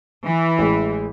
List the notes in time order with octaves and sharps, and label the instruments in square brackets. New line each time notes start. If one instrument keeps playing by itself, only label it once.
[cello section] E3
[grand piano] A1 G#3